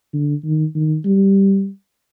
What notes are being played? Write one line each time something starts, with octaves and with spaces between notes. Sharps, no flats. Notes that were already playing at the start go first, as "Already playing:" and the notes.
D3
D#3
D#3
G3